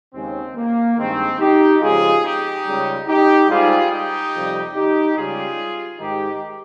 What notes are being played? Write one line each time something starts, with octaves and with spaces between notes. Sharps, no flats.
D#2 C#3 G#3 C4
A#3
G2 D#3 G#3 C4
D#4 G4
F2 C#3 G#3 F4 G#4
D#4 G4
C#2 C#3 G3
D#4 G4
G#2 G3 F4 G#4
D#4 G4
F2 C3 G3
D#4 G4
C#2 C#3 G3 F4 G#4
G#2 D#3 G#3 D#4 G4